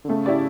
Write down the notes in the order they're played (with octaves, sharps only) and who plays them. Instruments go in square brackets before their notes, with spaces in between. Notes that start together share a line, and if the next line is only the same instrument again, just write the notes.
[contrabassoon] D3
[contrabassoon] C#3 [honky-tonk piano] A3
[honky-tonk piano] E4 G4 D5